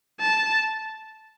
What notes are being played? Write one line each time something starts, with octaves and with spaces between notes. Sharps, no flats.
A5